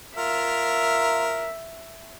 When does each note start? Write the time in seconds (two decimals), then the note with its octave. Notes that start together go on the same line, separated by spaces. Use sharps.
0.17 F4 A#4 E5